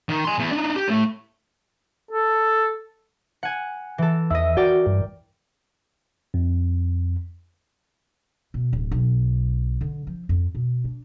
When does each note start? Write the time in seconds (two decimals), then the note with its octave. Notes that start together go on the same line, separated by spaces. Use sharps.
0.09 D#3
0.25 G#5 C6
0.39 E2
0.52 D4 D#4
0.76 G4
0.88 A2 A3
2.12 A4
3.43 F#5 G#5
3.98 E3 A4
4.31 E2 E4 D#5 E5
4.57 F#4 A#4 D5 G5
4.86 G2
6.34 F2
8.54 B2
8.73 D1
8.91 B1
9.81 D3
10.07 F3
10.29 F2
10.55 B2
10.84 D4